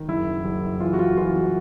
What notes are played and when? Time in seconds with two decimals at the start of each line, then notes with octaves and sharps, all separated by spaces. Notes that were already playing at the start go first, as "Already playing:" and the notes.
Already playing: D#3
0.08 F#1 E4
0.45 F#1
0.81 E3 F4
0.93 F#4
0.99 F4
1.17 E3 F4
1.36 F#4